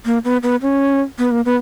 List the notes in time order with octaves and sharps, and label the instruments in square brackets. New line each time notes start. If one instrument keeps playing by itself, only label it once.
[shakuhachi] A#3
B3
B3
C#4
B3
A#3
B3